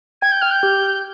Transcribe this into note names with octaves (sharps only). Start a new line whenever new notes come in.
G5 G#6
G6
G5 F6
G6
G4